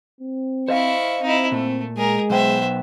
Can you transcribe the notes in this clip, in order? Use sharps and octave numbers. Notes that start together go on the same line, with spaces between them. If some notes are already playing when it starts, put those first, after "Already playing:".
C4
E4 C5 D#5 F5 C#6
C4 D#4 E4
A#2 A3
G#3 G#4 A#4
B1 B3 C5 E5 G5